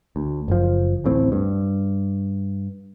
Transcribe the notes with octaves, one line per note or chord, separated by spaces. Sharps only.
D2
F#1 F3
D1 A1 A2 C4
G2